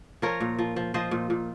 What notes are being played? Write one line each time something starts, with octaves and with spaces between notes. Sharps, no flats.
F3 A#4 C#5
A#2
F3
F3
F3 C5 D#5
A#2
A#2